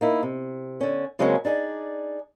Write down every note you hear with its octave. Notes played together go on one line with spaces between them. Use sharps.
A#3 D#4 E4
C3
D3 C#4
C#3 F#3 G#3 A#3 C4 C#4
D4 D#4 G#4 D5